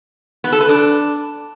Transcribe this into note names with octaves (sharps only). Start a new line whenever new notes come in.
B3
A4
B4
D4